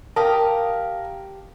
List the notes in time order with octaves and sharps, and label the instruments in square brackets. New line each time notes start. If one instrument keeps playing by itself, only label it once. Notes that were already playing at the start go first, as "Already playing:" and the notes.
[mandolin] G4 F5 D#6 [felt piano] A#4 [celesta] A5